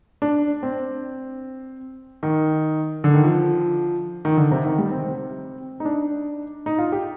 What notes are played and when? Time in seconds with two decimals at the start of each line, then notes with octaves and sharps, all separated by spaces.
0.22 D4
0.63 C4
2.23 D#3
3.04 D3
3.14 D#3
3.24 F3
4.25 D#3
4.37 D3
4.51 C3
4.65 D#3
4.78 G3
4.91 C4
5.80 D#4
5.85 D4
6.66 D#4
6.78 F4
6.92 G4